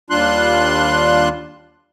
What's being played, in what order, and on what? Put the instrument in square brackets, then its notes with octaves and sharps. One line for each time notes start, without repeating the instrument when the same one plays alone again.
[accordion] D#2 G3 D4 F4 C6 F#6